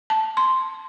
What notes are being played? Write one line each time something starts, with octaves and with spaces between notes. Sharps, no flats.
A5
C6